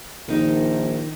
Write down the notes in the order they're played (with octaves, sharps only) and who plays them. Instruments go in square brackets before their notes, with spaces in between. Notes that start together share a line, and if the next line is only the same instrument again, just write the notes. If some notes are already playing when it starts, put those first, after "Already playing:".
[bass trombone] A#1 [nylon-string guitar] D#3 D#4